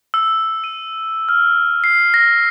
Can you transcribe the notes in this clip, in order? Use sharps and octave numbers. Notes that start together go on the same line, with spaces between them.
E6
D#7
F6
C7
A#6